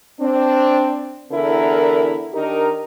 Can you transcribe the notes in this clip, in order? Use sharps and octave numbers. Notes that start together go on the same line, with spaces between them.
C4 D4
E2 D3 E4 A#4
D#3 D4 D#4 G4 A#4